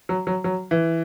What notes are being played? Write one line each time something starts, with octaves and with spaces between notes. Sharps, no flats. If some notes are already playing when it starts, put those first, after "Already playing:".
F#3
F#3
F#3
E3